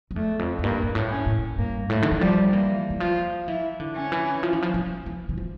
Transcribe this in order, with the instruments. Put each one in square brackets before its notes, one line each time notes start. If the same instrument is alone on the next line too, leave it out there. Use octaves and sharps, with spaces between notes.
[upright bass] F2
[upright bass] E2 [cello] A3
[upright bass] F2
F2
[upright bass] G2 [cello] A#3
[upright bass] G2
A2
[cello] C#4
[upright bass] A2
[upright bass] G2 [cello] A#3
[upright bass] A2 [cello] A3
[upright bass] D3
E3
[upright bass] F3 [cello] G3
[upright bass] E3 [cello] A#3
[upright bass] E3
[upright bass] F3 [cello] F4
[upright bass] E3 [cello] E4
[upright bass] D3
[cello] C#4
[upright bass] E3
F3
E3
F3
F3
E3
E3
F3